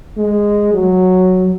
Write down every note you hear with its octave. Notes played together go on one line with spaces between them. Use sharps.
G#3
F#3